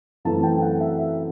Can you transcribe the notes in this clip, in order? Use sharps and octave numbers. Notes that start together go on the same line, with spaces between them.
F#2 E3 A3 C4 A5
G5
F#5
E5
E5